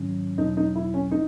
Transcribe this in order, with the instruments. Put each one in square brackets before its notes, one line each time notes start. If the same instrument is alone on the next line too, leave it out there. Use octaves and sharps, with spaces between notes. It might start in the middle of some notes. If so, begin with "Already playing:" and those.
Already playing: [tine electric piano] G#2 D#3 F#3 C#4
[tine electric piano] E2 B2 F#3 [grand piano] D#4
[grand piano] D#4
E4
C#4
[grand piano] D#4 [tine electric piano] E4